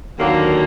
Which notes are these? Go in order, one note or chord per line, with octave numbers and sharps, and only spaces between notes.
D#2 D3 F#3 A#3